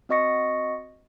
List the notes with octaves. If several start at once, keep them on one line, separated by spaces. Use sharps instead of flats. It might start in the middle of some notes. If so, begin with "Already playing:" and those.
C4 F#4 D#5 C#6 A#6 C#7